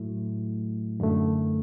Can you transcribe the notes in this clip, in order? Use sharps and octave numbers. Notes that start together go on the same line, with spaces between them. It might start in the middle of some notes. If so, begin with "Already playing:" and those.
Already playing: A2 F#3 A3 E4
F#2 D3 A3